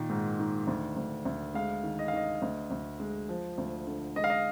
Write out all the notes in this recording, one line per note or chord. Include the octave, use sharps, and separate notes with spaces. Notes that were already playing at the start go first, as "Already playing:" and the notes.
Already playing: A#2 D#3
G#2
D#3
D2
D2
D2
G#3 F5
D#3
D#5
F5
D#3 D#5
D2
D2
G#3
F3
D2
D3
G#3 D#5
F5
D#5